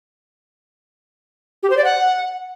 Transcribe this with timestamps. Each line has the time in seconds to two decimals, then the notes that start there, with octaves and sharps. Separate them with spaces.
1.63 G4
1.70 C5
1.77 D5
1.84 F#5